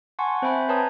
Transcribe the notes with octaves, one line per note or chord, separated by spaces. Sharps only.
F#5 G#5 A5 C6 C#6
C4 C5 E5 G5 G#5 B5
B4 C#5 A5 A#5 D#6